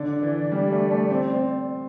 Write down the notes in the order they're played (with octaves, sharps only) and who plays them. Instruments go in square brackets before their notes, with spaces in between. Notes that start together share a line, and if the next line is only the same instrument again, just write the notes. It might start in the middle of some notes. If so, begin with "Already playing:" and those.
Already playing: [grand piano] D3 [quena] D5
[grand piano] E3
G3
A3
A3
C4
C4